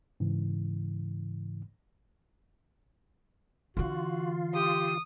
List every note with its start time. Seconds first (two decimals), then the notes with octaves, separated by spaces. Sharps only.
0.20 G#2 C#3 E3
3.77 D3 E3 F4 F#4
4.55 G4 D#6